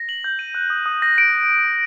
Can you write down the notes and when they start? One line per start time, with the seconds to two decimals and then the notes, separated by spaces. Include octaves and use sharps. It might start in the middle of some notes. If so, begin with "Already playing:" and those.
Already playing: A#6
0.09 F#7
0.24 G6
0.39 D#7
0.55 F#6
0.70 D#6
0.86 D#6
1.02 A#6
1.18 D7